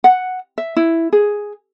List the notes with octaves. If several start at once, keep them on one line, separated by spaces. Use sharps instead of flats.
F#5
E5
E4
G#4